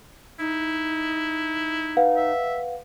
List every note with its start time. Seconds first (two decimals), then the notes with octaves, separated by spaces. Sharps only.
0.39 D#4 E4
1.97 B4 F5 F#5
2.16 E5